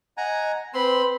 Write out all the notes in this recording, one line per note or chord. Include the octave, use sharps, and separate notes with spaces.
D#5 F#5 G#5 A#5
C4 B4 B5 C6